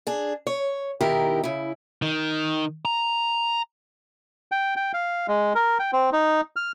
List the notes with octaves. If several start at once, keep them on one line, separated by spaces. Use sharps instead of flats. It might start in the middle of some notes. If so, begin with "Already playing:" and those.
D4 G#4
C#5
B2 D#3 E4 G4 A#4
C#3 E4
D#3
A#5
G5
G5
F5
G#3
A#4
G5
C4
D#4
F6